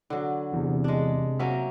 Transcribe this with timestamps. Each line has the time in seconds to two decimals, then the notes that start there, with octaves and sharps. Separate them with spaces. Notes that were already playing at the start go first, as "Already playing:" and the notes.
0.10 D3 F#3
0.53 E2 C3
0.84 G#3 D4
1.39 F#3 A#3 C#4 E5 A#5